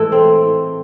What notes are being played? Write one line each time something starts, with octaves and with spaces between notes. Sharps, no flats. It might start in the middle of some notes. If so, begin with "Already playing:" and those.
Already playing: A2 E3 G#3 A4
C4